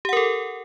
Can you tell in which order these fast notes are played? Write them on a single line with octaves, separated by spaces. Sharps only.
G4 F#5 A#4 A4